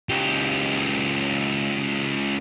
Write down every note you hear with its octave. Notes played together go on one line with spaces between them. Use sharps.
C#2 G4